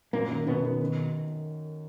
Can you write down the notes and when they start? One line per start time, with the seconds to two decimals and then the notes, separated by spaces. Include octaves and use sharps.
0.13 F#2 A#2 A#3
0.30 D#3
0.47 F#2 B2 B3
0.63 D#3
0.81 D#3